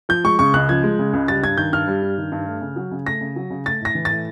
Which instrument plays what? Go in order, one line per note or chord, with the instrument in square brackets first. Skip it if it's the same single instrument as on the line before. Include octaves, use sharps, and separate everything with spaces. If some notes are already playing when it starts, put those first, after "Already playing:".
[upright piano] F3 [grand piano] G6
[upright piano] G#3 [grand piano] C#6
[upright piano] C#3 [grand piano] C#6
[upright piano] C#2 [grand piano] F#6
[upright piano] F3 [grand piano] G#6
[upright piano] G#3
C#3
C#2
[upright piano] G3 [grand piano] A6
[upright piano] G2 [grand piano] G#6
[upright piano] D#3 [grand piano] G6
[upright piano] G2 [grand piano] F6
[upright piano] G3
G2
D#3
G2
A3
C#3
F#3
C#3
[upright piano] A3 [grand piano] A#6
[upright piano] C#3
F#3
C#3
[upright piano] A3 [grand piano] A6
[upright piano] A2 [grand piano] A#6
[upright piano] E3
[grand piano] A6
[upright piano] A2